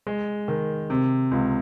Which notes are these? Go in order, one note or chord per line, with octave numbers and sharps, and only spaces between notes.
G#3
D#3
C3
C#2